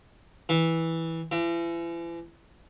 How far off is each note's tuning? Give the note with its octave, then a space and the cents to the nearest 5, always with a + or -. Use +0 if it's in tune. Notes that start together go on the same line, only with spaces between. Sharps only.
E3 -10
E3 +40